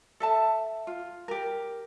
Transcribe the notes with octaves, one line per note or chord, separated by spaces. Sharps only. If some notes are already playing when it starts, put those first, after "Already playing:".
A4 E5 A5
F4
G4 A#4